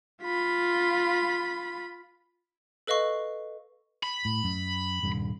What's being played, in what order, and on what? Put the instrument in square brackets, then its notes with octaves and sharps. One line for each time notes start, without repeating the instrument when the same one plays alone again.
[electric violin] F4 B5
[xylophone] A4 B4 D#5 F5 C#6
[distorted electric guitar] B5
[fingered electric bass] A2
F#2
D#1 G2 C3